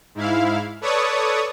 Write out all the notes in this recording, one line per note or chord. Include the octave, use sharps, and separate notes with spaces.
G#2 E4 F5
A4 B4 C#5 D5 C#6 D#6